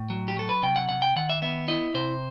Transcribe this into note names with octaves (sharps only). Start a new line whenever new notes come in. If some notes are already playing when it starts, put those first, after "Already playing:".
Already playing: A2
F#3
G4
F#3 A4
B4
C3 G5
F#5
C3 F#5
G5
D#3 F#5
E5
B3 E5
E4 D#5
C3 C5